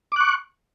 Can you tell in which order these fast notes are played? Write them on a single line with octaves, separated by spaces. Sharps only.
D6 F#6 C#6